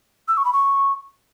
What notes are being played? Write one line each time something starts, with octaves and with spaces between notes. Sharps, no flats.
E6
C#6
B5
C#6